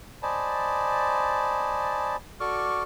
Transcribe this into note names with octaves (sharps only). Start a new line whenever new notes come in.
C5 D5 D#5 G#5 A5 B5
F#4 A4 D5 C#6 D6 F6